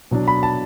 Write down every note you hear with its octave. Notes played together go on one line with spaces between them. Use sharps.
B2 F#3 D4
B5
A5